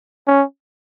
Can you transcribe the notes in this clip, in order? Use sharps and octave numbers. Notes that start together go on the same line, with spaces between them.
C#4